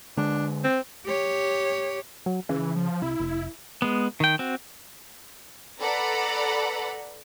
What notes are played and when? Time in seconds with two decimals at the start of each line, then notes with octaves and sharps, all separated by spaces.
0.17 D3 G#3 D4
0.64 C4
1.06 G4 C#5
2.26 F#3
2.49 C#3 E3
2.76 F3
3.02 C2 E4
3.20 F1
3.82 G#3 B3
4.20 D#3 G5
4.39 C4 F#4
5.80 A4 B4 D5 F#5 A#5 B5